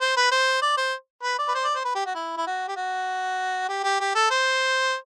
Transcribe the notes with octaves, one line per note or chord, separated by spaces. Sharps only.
C5
B4
C5
D5
C5
B4
D5
B4
C5
D5
C5
B4
G4
F#4
E4
E4
F#4
G4
F#4
G4
G4
G4
A4
C5